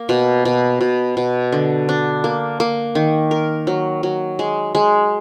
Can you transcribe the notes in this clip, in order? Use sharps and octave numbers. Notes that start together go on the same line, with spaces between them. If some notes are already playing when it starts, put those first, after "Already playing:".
Already playing: A#3
B2
B2
B2
B2
D3
D4
A#3
A#3
D#3
A#4
F#3
F#3
G#3
G#3